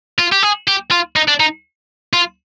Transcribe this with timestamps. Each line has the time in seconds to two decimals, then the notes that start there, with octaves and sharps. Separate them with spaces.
0.19 F4
0.32 G4
0.43 G#4
0.68 G4
0.91 F4
1.16 D#4
1.28 D4
1.40 D#4
2.13 F4